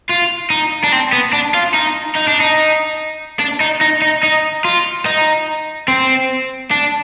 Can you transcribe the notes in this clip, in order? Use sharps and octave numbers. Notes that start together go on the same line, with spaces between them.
F4
D#4
D4
C4
B3
D4
F4
D#4
D#4
D4
D#4
D4
D#4
D#4
D#4
D#4
F4
D#4
C4
D4